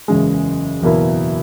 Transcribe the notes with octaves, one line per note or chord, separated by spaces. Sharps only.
F#1 E2 C#3 G#3
F#1 E2 B2 A#3 E4